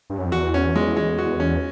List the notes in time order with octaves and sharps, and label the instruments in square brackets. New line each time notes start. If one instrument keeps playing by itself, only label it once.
[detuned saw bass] G2
F#2
F2
[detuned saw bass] E2 [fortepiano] F#4
[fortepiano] C#4
G#3
G#3
F#4
C#4